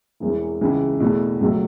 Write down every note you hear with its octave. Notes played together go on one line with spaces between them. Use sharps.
E1 E2 E3
C#2 C#3 E3
E2 B2 A3 E4
C#2 B2 F#3 A3